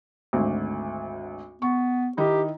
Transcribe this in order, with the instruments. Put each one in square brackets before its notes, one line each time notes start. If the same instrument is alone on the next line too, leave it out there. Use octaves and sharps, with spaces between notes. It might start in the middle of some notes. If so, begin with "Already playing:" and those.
[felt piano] G#1 D2
[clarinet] B3 [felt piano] C#6
[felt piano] D#3 D#4 E4 [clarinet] G4